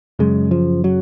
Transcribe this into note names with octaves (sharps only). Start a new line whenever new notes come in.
F#2 C#3 G#3
F3
F#3